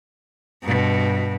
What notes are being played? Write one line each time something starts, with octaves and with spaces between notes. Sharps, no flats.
G2 B2